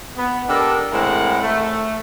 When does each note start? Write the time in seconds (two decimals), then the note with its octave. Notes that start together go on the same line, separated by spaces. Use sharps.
0.17 B3
0.48 D4 G4 A4 A#4 D5 D#5
0.90 A2 E3 G#3 C4 A#4 F#5
1.41 A3